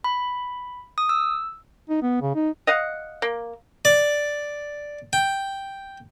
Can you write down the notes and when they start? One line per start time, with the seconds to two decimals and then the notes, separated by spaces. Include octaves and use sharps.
0.04 B5
0.98 D#6
1.09 E6
1.89 D#4
2.02 B3
2.22 C#3
2.35 D#4
2.67 D#5 F5 F#5
3.22 A#3
3.85 D5
5.13 G5